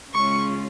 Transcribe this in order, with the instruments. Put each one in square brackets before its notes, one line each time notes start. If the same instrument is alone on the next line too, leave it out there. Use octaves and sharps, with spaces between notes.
[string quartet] C#3 G#3 C#4 F4 C#6